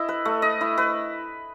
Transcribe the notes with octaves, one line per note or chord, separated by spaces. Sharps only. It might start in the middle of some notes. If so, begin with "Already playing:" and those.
Already playing: E4 D#5
B4
A3
D#5
E4
B4